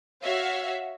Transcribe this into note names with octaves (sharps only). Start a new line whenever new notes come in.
F#4 C#5 E5 F5